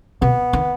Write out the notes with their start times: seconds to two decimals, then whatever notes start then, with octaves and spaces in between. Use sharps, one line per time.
0.22 B2 B3
0.53 D#3